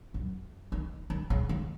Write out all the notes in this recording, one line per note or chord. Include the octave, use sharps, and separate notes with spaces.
F#2
D#3
D#3
C#3
D#3